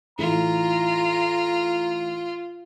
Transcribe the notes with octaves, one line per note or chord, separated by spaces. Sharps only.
A2 E3 F4 A#5